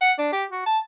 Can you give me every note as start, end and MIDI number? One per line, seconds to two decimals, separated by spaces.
0.01 0.12 78
0.18 0.29 62
0.33 0.44 67
0.51 0.62 66
0.66 0.79 81